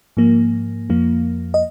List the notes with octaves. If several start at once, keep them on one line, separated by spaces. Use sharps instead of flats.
G#2 F3 A#3
F2 F3 A#3
D#5